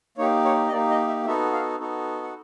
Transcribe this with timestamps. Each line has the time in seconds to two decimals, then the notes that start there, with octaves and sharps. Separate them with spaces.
0.18 A#3 D#4 G4 C#5
0.45 C#5
0.68 D#5
0.72 A#3 D#4 G4 D5
0.90 D#5
1.08 E5
1.26 B3 D#4 F#4 A4 E5
1.53 F5
1.80 B3 D#4 F#4 A4
2.23 F#5